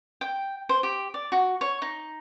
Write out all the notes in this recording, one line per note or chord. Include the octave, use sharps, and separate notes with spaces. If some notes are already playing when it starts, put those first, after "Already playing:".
G5
C5
G4
D5
F#4
C#5
D#4